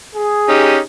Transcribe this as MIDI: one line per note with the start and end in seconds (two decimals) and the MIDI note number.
0.16 0.79 68
0.49 0.78 61
0.49 0.78 63
0.49 0.78 67